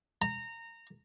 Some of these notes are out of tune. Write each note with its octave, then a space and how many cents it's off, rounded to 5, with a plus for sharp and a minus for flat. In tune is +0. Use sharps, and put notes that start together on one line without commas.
A#5 -20